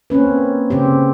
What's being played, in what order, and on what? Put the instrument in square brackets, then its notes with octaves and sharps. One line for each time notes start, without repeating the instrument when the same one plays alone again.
[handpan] A#3 C4 C#4 B4
C#3 C4 G4